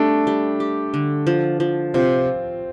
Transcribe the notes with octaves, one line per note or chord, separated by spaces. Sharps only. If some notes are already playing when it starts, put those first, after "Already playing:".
Already playing: G3 A3 D4
G3
G4
D3
F3
F3
C3 C4 F4